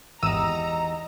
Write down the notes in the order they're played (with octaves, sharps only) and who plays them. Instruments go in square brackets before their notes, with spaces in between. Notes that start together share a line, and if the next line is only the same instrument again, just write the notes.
[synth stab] G#1 D#7 E7 [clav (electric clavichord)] E2 G4 [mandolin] D#4 E6 [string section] A#5